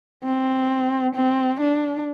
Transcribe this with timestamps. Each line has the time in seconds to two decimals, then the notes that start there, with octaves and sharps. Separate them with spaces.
0.25 C4
1.15 C4
1.61 D4